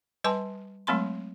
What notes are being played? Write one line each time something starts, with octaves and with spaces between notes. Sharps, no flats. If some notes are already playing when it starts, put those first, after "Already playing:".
G3 B4 G#5 A5 C6 D6
F#3 G#3 A3 C4 B5 C6